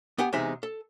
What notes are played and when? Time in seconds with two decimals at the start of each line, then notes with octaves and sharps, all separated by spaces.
0.18 B3 G4 F#5 G#5
0.33 E2 C3 G#3 D#4 G#4 E5
0.63 A4